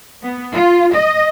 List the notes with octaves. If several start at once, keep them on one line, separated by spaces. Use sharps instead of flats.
B3
F4
D#5